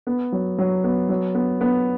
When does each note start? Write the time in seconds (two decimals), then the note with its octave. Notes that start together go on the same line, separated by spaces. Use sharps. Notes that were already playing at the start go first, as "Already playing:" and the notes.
0.07 B3
0.32 F#3
0.58 F#3
0.84 B3
1.09 F#3
1.35 B3
1.61 B3